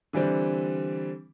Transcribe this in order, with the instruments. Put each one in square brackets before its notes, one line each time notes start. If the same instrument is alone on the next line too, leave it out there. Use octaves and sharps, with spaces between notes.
[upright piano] D3 E3 G3 C4